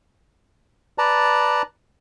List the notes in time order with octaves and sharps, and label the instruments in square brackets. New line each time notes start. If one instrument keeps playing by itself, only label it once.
[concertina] B4 D5 A5 A#5